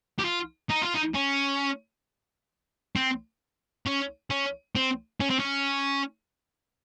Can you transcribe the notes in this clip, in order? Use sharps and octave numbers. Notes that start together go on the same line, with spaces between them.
G4
F4
D#4
F4
D#4
C#4
C4
C#4
C#4
C4
C#4
C4
C#4